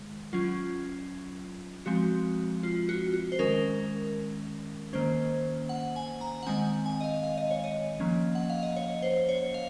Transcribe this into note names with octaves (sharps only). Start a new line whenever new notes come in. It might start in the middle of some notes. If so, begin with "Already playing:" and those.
Already playing: D#3 G#3
F#3 C#4 F4
F3 G#3 C4 F#4
F4
F#4
F#4
C5
D#3 G#3 C#4 A#4
D#3 A#3 C#4 C5
F#5
G#5
A#5
F#5
D#3 G#3 C4 G#5
G#5
D#5
F5
F5
D#5
C#5
D#5
F3 A#3 C#4
F#5
F5
D#5
C#5
C5
C#5
F5